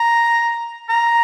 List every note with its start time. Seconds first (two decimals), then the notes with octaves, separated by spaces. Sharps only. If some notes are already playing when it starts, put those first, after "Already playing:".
Already playing: A#5
0.90 A#5